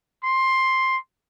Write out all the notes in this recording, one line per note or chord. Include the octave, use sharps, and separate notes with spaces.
C6